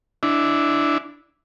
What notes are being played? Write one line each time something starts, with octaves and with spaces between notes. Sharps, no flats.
D4 E4